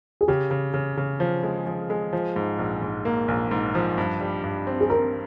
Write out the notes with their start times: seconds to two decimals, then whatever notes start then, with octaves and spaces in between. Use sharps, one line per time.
0.21 G#4
0.28 C#3 G4
0.51 C#3
0.74 C#3
0.97 C#3
1.20 F3
1.43 G#3
1.66 F3
1.90 G#3
2.13 F3
2.36 G#2
2.59 A#1
2.82 G#2
3.05 A#3
3.28 A#1
3.51 G#2
3.75 F3
3.98 G2
4.21 G3
4.44 G2
4.67 C4
4.81 G#4
4.90 C4 A#4